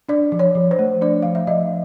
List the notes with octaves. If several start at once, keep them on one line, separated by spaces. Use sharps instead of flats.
D4 D5
F3
C#5
F3
C5
A3
D4 D5
F3 F5
E5
F3 D#5